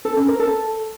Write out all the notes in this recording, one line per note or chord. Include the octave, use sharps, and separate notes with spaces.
A4
C#4
A#4
A4